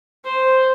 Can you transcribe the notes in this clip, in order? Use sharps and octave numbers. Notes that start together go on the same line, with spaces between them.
C5